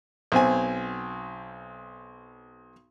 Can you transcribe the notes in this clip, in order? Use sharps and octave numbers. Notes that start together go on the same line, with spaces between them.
B1 C4 G#5